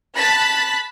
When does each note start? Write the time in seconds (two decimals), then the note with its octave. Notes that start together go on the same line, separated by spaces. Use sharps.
0.15 A5 B5 F#6 B6